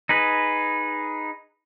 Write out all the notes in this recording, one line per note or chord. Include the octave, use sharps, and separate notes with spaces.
D#4 G#4 B4